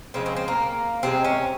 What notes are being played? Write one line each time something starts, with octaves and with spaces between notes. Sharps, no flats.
C#3 F3 G#3 C4
C4
C4
A#3
C3 F3 G#3 C4
C#4